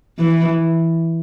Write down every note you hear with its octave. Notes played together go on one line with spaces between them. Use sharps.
E3